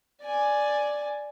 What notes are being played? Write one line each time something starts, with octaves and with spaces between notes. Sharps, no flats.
D5 G#5